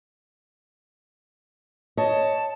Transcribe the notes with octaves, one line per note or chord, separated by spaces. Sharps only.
C#5 D#5 A5